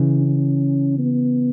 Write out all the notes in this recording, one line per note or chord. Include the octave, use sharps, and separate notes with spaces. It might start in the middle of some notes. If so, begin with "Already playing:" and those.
Already playing: C#3 E3
C#4
B3